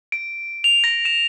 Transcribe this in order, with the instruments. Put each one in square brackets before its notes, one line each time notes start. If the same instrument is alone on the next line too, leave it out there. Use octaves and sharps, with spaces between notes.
[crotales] D7
F7
A#6
E7